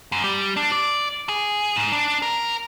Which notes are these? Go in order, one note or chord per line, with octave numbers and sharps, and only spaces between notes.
F#2
G3
D4
D5
G#4
G#2
D4
A#4